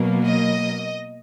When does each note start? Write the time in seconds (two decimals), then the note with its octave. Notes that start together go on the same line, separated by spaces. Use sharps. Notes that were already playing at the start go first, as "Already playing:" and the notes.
Already playing: B2 F#3 A#3
0.26 D#5